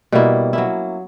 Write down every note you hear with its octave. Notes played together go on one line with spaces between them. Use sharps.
B2 G3 A#3 E4
F#3 C#4 E4